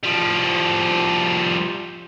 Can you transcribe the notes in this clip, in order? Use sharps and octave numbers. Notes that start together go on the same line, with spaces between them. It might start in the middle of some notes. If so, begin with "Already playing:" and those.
F3 G3